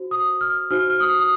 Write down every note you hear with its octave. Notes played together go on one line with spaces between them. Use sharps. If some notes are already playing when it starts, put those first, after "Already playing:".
Already playing: F#4 C5
D#6
F6
D#4 F#4 C5 F6
F6
D#6
D#6